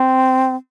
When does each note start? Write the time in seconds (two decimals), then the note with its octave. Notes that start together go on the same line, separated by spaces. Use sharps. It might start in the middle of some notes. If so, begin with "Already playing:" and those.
Already playing: C4